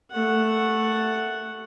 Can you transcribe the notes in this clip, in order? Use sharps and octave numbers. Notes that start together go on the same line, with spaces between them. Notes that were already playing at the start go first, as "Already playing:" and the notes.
A3 F#5